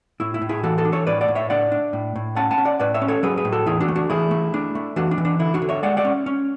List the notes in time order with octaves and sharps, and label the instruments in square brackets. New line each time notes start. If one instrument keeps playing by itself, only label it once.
[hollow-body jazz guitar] A2 E4
E4
A2
E4 G#4
E3 F#4 A4
F#4 A4
D4
A4 C#5
A2 B4 D5
D5 F#5
A2
C#5 E5
D4 D5 F#5
D4
A2
A2
C#4 F#5 A5
F#5 A5
C#4
D5 F#5
A2 B4 D5
C#5 E5
C#4
A4 C#5
F#3 G#4 B4
G#4 B4
A2
F#4 A4
E3 E4 G#4
D4 F#4
A3
D4 F#4
E3 E4 G#4
A3
D4
A3
E3 D4 F#4
D4
E3
D4
D3 E4
D4 F#4
D3
C#5 E5
G#3 D5 F#5
D5 F#5
C#4
C#4